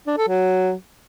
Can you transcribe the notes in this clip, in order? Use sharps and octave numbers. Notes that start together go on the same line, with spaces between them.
D4
A4
F#3